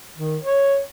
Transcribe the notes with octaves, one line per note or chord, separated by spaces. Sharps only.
D#3
C#5